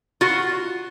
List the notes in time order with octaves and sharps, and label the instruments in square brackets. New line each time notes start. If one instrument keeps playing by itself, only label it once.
[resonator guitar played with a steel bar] F4 F#4